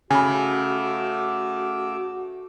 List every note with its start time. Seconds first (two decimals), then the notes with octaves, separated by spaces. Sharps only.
0.11 C#3 A3 F#4 G#5 B5 D6 E6